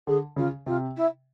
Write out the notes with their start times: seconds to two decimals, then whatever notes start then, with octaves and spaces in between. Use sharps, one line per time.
0.07 D3 G#4
0.36 C#3 F4
0.66 C3 F4
0.96 E4